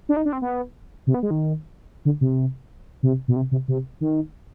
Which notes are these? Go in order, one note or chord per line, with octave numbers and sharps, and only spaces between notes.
D4
D#4
D4
C4
B3
C3
B3
G#3
D#3
D3
C3
C3
B2
C3
C3
C3
D#3